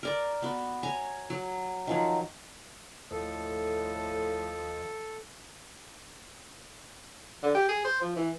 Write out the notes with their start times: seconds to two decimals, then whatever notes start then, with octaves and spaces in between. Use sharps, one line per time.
0.03 A#4 D5 A#5
0.42 B3 F#4
0.83 C#5 G#5 A#5
1.30 F#3
1.87 D#3 F3 F#3
3.11 D#2 A2 F3 A4 D#5
7.43 D3
7.55 G4
7.69 G#4
7.84 C5
8.01 F3
8.16 E3